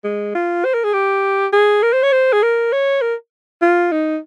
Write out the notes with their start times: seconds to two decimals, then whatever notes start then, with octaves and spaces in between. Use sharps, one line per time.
0.04 G#3
0.35 F4
0.65 C5
0.74 A#4
0.84 G#4
0.93 G4
1.53 G#4
1.82 A#4
1.93 C5
2.03 C#5
2.12 C5
2.32 G#4
2.42 A#4
2.72 C#5
3.01 A#4
3.61 F4
3.92 D#4